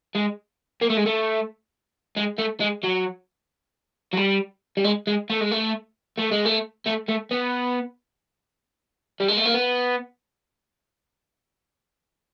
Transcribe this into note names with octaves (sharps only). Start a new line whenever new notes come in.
G#3
A#3
A3
G#3
A3
G#3
A3
G#3
F#3
F#3
G3
G3
G#3
G#3
A3
G#3
A3
A3
G#3
A3
A3
A3
B3
G3
G#3
A3
A#3
B3